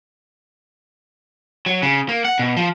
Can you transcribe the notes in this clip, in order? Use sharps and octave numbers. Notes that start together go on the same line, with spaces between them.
F#3
C#3
A#3
F#5
B2
F3